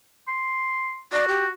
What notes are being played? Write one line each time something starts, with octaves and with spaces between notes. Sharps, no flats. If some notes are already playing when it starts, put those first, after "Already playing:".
C6
F#4 D5
G4